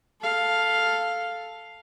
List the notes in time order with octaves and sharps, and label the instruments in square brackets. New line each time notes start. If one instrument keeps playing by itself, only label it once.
[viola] A4 F5